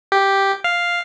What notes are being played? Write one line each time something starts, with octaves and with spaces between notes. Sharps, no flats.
G4
F5